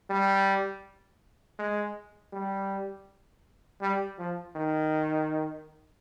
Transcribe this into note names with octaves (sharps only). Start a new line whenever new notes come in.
G3
G#3
G3
G3
F3
D#3